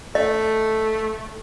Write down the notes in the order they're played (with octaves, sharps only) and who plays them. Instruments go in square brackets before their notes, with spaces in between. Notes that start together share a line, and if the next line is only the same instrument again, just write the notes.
[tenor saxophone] A3 [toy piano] D#5